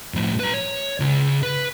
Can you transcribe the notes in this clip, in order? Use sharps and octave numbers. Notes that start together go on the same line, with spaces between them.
A2 F3
B4 A#5
C#5
C#2 C#3
B4